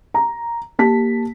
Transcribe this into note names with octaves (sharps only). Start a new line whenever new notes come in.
A#5
A#3 G4 A5 B6